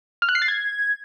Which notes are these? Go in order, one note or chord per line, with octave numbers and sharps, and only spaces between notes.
F6
F#6
C7
A6
G#6